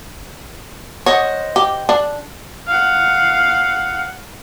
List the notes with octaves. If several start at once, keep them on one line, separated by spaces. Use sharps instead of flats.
C5 C#5 D#5 F#5
G4
D4
F5 F#5